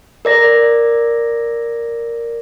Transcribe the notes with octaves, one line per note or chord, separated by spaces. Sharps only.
A#4 D5 A#6